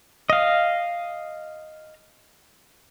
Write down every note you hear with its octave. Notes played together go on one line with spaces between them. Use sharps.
D#5 F5